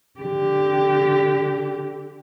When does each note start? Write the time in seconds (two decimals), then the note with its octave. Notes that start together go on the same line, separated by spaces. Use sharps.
0.20 D3 G4